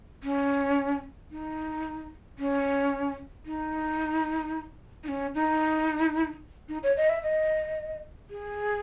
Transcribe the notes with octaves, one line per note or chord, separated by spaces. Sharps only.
C#4
D#4
C#4
D#4
D#4
C#4
D#4
D#4
C#5
D#5
E5
D#5
G#4